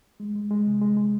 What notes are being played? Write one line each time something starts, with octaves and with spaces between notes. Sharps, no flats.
G#3
G#3
G#3
C3
G#3
G#3